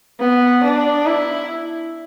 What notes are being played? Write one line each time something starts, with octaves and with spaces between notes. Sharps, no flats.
B3
D4
E4